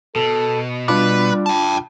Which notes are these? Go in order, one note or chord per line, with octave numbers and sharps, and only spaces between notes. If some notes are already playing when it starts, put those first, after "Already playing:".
B2 A4
G3 D4 F4 B4 D6
G5 A5